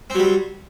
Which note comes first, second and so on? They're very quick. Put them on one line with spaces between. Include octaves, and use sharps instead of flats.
C4 F#3 G3